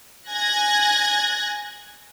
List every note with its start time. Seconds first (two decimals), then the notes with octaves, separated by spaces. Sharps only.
0.29 G#5 F#6 G#6 A#6